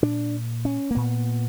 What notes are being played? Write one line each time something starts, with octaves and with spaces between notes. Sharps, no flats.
A#2 D4
C#4
A#3
A#2 B3